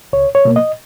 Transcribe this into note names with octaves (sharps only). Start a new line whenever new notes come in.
C#2 C#5
C#5
B2 A#3
D#5